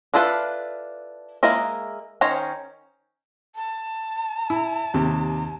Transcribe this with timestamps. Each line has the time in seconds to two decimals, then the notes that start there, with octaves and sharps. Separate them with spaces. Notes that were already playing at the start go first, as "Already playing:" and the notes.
0.14 D4 E4 F4 A4 B4
1.43 G#3 A#3 E4 A#4 D#5
2.21 D#3 C#4 C5 C#5 A#5
3.56 A5
4.50 E4
4.94 D#2 C3